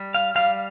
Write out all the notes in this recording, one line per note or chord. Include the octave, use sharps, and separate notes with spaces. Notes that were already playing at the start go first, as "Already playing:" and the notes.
Already playing: G3
F5
G3 F5